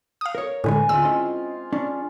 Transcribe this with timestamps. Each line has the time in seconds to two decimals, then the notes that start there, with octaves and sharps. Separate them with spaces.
0.21 F5 D#6
0.35 A#4 C#5
0.64 A2 D3 G#3 B4 G#5
0.89 D2 G#3 C4 F4 E6
1.05 C#4 E4 D#5
1.73 C#4 D4